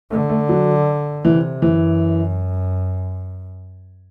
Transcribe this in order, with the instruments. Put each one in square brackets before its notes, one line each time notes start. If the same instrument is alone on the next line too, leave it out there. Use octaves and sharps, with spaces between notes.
[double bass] D3 [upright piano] A3
[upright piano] A3
F#3
[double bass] C3 [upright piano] E3
[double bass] F#2 [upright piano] E3